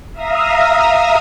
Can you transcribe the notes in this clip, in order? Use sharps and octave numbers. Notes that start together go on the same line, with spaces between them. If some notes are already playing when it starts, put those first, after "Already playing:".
E5 F5 A#5 D#6